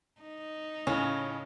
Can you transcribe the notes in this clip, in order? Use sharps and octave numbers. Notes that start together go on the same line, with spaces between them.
D#4
A2 C#3 C#4